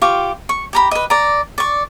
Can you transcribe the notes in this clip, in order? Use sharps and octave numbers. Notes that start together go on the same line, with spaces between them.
F4 G4 C#6 D6
C#6
G4 A#5 B5
B4 D#5
D5 A#5
D5 C#6